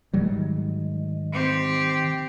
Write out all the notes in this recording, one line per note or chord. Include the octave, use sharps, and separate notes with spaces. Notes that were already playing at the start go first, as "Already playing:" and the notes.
G#2 D#3 F#3 G3
C4 G4